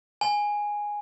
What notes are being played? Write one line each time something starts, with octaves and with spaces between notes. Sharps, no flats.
G#5